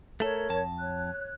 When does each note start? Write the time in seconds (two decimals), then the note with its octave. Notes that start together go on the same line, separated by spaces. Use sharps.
0.20 A3 A4 A#4 C#5
0.50 F2 A5
0.79 C#5 F#6